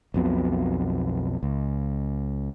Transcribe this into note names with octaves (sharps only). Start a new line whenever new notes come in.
B1 F2 B2
C#2